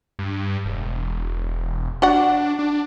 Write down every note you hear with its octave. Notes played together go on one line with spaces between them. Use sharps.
G2
E1
D4 F#4 D5 F#5
D4